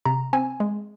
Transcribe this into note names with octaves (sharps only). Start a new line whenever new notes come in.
C3 A#5
C4 G#5
G#3